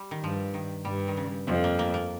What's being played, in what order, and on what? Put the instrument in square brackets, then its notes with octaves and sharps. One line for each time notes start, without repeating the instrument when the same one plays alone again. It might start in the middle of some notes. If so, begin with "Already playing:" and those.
Already playing: [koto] G3
D#3
[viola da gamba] G2 [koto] F3
[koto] D#3
[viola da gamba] G2 [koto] G3
[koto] D#3
C#3
[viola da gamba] F2 [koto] C3
[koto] A#3
A#3
A#3